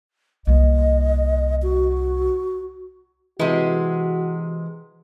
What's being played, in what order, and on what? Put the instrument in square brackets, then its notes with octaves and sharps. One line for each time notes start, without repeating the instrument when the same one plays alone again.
[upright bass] C2 A#3 [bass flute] D#5
[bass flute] F#4
[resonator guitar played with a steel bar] C3 G#3 [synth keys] E3 [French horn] F#4